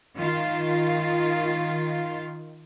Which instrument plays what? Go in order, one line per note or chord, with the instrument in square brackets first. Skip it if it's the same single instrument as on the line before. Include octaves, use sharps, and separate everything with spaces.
[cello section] D#3 F4